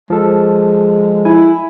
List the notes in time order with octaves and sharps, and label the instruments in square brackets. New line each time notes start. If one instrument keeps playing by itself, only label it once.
[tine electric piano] F3 A4 [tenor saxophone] G#3
[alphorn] E4 [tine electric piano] G#5